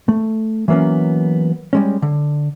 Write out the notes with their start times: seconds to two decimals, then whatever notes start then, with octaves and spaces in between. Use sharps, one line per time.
0.09 A3
0.68 E3 F#3 A#3 B3 C#4
1.73 G3 G#3 C#4
2.02 D3